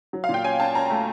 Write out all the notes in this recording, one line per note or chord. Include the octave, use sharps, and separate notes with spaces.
F#3
F5
A#2
G5
C#4 G#5
C#4 A5
C#4 A#5
A3